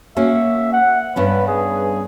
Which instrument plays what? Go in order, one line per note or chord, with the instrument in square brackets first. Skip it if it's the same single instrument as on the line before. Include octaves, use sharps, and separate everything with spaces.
[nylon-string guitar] A#3 C#4 F#4 [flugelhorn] E5
[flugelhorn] F#5
[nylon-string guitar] G2 B3 C#4 [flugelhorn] B4
[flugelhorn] G#4